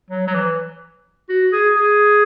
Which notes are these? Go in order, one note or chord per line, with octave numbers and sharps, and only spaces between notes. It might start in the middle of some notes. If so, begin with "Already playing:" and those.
F#3
F#3
E3
F#4
G#4
G#4